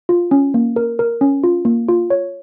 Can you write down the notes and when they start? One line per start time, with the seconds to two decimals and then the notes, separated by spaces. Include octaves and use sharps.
0.09 F4
0.31 C#4
0.54 A#3
0.76 A#4
0.99 A#4
1.21 C#4
1.44 F4
1.65 A#3
1.88 F4
2.10 C#5